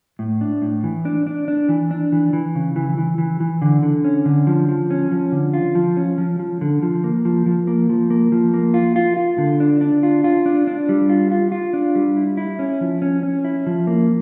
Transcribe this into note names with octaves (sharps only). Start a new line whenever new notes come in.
A2
D4
A2
E3
D4
D4
D4
E3
D4
E3
E3
C#3
E3
E3
E3
E3
D3
D3
C#4
D3
F3
F3
C#4
F3
D3
F4
F3
C#4
F3
F3
D3
F3
A#3
F3
F3
A#3
F3
A#3
F3
A#3
F4
F4
F4
D3
D4
D4
F4
F4
D4
D4
G3
F4
F4
F4
D4
G3
E4
E4
C#4
F3
C#4
C#4
E4
F3
A#3